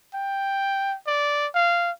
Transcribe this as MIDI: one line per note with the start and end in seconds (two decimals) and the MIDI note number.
0.14 0.96 79
1.07 1.48 74
1.55 1.91 77